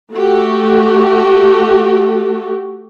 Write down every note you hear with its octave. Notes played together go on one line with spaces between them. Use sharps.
A3 F#4 G4